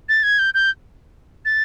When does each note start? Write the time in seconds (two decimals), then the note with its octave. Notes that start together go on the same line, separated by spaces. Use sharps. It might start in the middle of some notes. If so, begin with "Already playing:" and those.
0.09 A6
0.23 G#6
0.39 G6
0.54 G6
1.45 A6